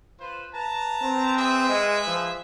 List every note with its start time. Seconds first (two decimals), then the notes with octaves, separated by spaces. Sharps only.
0.19 F4 B4 C5
0.54 B4 A5 A#5
1.02 C4
1.37 G#4 B4 E5
1.69 G#3
2.07 F3